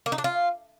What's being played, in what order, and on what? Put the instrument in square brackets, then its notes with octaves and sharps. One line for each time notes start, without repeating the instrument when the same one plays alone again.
[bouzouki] A#3
D#4
D4
F4